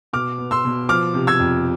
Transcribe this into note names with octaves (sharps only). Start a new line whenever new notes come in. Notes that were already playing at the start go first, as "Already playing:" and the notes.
B2 D6 F6
B3
C6 E6
B2
F3 D6 F6
C3
E6 G#6
F2